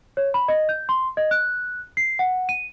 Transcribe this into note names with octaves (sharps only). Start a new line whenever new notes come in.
C#5
B5
D#5
G6
C6
D#5
F#6
C7
F#5
D#7